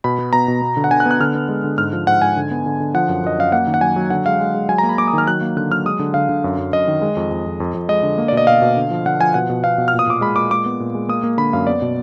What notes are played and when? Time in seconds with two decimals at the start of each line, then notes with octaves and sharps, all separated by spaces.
0.04 B2 B5
0.19 B3
0.33 B2 A#5
0.48 B2
0.62 B3
0.77 D3
0.84 F#5
0.91 D3 G#5
1.00 F#6
1.06 B3
1.11 F#6
1.20 D3 F6
1.35 B3
1.49 G#3
1.64 D3
1.78 G#2 F6
1.93 F3
2.07 G#2 F#5
2.22 G#2 G#5
2.37 D3
2.51 B3
2.66 D3
2.80 D3
2.94 F3 F#5
3.09 F#2
3.24 F#2 D#5
3.38 F#2 F5
3.52 A#3 F#5
3.67 D#3
3.74 F#5
3.81 F#3 G#5
3.96 F#3
4.10 D3 F#5
4.26 G#3 F5
4.40 G#3
4.54 G#3
4.69 F#3 G#5
4.78 A#5
4.83 A#3
4.89 B5
4.98 A#3 D6
5.08 D#6
5.13 D#3 F6
5.27 F#3 F#6
5.41 A#3
5.57 D3 F#6
5.70 F#3 F6
5.86 G#3 D#6
5.99 D3
6.14 D3 F5
6.29 D3
6.44 F#2
6.58 F#2
6.73 F#2 D#5
6.88 D#3
7.02 G#3
7.17 F2
7.31 F2
7.46 F2
7.60 F2
7.74 F2
7.89 G#3 D#5
8.03 D3
8.18 A#3
8.28 B2 D5
8.37 D#5
8.47 B2 F5
8.62 B2
8.76 D3
8.91 F3
9.06 D3 F#5
9.20 F3 G#5
9.34 B2 F#5
9.49 B2
9.64 B2 F5
9.78 B2
9.88 F6
9.93 A#2
9.99 D#6
10.07 A#2 D6
10.21 G#3 B5
10.36 A#2 D6
10.51 G#3 D6
10.66 B3
10.80 A#2
10.95 G#3
11.09 A#3 D#6
11.23 A#3
11.37 D3 B5
11.53 F#2 F5
11.67 B3 D5
11.82 B2